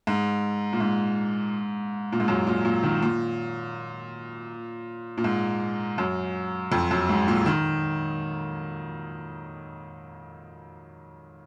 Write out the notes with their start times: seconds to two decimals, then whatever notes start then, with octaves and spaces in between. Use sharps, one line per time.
0.07 G#2
0.73 A#2
0.80 G#2
2.12 A#2
2.20 G#2
2.28 F#2
2.47 A#2
2.65 A#2
2.83 D#3
3.02 A#2
5.17 A#2
5.24 G#2
5.98 F#2
6.72 F2
6.91 F#2
7.09 G#2
7.28 A#2
7.46 D#3